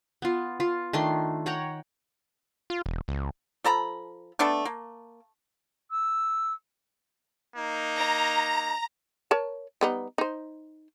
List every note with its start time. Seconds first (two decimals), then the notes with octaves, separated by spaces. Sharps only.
0.22 B3 F4
0.60 F4
0.93 D#3 A3 D4 C6
1.46 C#5 F#5 G5 A#5
2.70 F4
2.86 E1
3.08 C#2
3.64 F3 A4 A#5 B5
4.39 A3 B3 D4 A4
4.65 A#3
5.91 E6
7.56 A#3 D#4
7.96 A#5
9.31 A#4 C#5 A5
9.81 G3 B3 D#4
10.18 D#4 C5